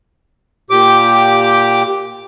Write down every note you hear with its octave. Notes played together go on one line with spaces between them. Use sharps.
A#2 G4 D6